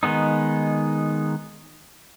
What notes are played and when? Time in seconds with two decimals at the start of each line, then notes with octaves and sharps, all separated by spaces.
0.03 D#3 G#3 B3 D#4